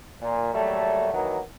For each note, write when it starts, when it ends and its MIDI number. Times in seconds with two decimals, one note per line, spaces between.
0.22 0.54 46
0.55 1.13 39
0.55 1.13 54
0.55 1.13 55
0.55 1.13 57
1.14 1.39 51
1.14 1.39 52
1.14 1.39 54
1.14 1.39 58
1.14 1.39 63
1.14 1.39 66